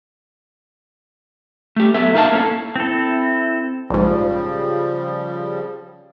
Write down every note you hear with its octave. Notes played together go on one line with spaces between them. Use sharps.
A3 G4
F#3 B3 A4 E5
A3 D#4 A#4 E5 F5 A5
A#3 C#4 D4 E4 A4
C4 E4 A4
A#1 G#2 C#3 F3 G3